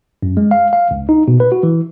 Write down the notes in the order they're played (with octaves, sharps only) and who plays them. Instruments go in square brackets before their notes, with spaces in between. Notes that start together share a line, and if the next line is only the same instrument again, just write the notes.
[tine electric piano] F#2
G#3
F5
F5
C#2
D#4
B2
B4
F#4
E3